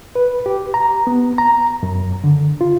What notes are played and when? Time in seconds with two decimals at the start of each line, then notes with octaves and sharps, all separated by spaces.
0.15 B4
0.46 G4
0.74 A#5
1.07 B3
1.38 A#5
1.83 F#2
2.24 D3
2.61 F4